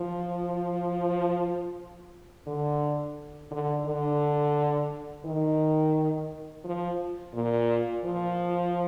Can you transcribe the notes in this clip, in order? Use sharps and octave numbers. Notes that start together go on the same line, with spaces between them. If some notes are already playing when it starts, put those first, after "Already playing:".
Already playing: F3
D3
D3
D3
D#3
F3
A#2
F3